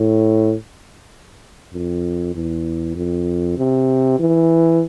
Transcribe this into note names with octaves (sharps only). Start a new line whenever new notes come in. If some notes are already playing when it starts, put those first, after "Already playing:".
Already playing: A2
F2
E2
F2
C3
E3